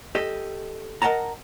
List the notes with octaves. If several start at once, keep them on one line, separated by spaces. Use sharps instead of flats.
G4 A4 D#5
A#4 D#5 F#5 A5 A#5